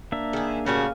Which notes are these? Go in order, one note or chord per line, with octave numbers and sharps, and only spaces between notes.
A#3 D4 E5
D#3 E4 G#4
A2 C#3 G3 A#3 F#4